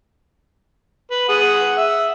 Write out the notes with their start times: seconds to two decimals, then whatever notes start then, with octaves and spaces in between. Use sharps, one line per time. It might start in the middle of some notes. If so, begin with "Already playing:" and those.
1.11 B4
1.29 G#4 F#5
1.77 E5